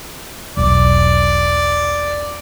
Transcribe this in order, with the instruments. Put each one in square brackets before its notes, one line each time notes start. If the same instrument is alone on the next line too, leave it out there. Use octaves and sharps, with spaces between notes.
[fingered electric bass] E1 B1 [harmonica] D5